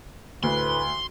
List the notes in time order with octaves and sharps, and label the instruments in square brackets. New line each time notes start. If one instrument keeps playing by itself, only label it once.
[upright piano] D2 [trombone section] A2 B4 [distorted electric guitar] C6